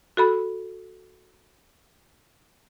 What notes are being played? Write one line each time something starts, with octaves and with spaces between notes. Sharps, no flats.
F#4 A4 B5